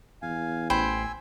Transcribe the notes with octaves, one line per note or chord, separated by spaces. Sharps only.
E2 F5 G#5
A1 C5 G5 G#5 B5 E6